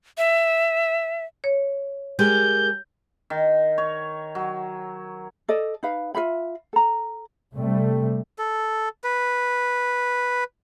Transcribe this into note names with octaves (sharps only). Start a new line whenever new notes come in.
E5
C#5
G#3 G4 A#4 G6
D#3
C#5
F#3
A4 D5 D#5
D#4 B4 F5
F4 A4 E5 B5
A4 A#5
C3 G3 A3
A4
B4